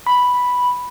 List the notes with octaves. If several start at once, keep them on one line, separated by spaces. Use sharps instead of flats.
B5